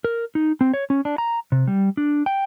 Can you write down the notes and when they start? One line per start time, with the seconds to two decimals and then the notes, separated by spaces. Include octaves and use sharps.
0.04 A#4
0.35 D#4
0.61 C4
0.74 C#5
0.90 C#4
1.05 D4
1.18 A#5
1.52 C3
1.67 G3
1.97 D4
2.26 G5